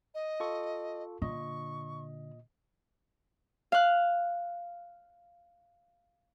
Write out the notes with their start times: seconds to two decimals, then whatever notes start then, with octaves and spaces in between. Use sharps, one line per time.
0.15 D#5
0.40 F4 A4 C#6
1.22 A#2 D3 D#5 C#6
3.72 F5 F#6